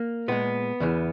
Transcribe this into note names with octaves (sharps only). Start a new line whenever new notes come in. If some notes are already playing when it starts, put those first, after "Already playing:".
Already playing: A#3
A#2 G#3 B3
E2 C#3 E3